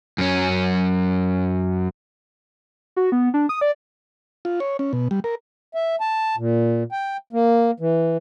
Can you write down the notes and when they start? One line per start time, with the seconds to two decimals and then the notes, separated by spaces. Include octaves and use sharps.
0.18 F#2 C#4
2.97 F#4
3.12 B3
3.34 D4
3.49 D#6
3.61 D5
4.45 F4
4.60 C#5
4.79 C#4
4.93 B2
5.11 G3
5.24 A#4
5.74 E5
6.01 A5
6.37 A#2
6.92 G5
7.33 A#3
7.80 E3